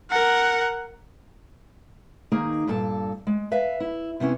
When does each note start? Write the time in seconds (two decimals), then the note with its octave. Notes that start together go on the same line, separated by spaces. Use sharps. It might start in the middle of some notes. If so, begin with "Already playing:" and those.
0.10 A#4 F#5
2.32 D#3 A#3 D#4 G#4
2.67 G2 A#2 A4 A5
3.27 G#3
3.51 B4 E5 F5
3.80 E4
4.20 C3 B3 C#4 E4